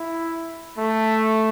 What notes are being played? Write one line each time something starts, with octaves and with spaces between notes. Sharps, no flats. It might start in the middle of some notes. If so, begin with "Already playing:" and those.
Already playing: E4
A3